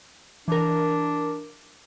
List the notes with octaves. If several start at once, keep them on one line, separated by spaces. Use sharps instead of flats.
E3 D4 A#4